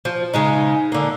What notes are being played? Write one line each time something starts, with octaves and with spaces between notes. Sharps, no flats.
F3
C#3 G#3 D#4
D3 A#3